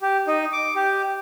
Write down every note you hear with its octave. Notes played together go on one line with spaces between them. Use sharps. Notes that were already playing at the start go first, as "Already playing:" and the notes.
G4
D#4
D6
G4